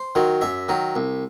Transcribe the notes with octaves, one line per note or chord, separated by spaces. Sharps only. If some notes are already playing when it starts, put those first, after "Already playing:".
Already playing: C5
D#3 F#3
F#2 E5
D#3 F#3
C2